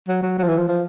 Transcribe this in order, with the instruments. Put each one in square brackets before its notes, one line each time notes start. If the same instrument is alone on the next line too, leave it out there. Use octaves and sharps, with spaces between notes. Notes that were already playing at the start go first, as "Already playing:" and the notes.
[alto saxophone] F#3
F#3
F#3
F3
E3
F3
F3